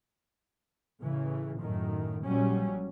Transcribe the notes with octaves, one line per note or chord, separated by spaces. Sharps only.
A1 C#3 E3
F#2 A2 D#3
A#1 F#3 G3 C#4